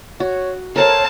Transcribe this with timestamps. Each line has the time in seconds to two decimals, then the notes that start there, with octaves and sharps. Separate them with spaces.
0.20 F#4 C#5
0.76 A4 A#4 C5 C#5 F5 A5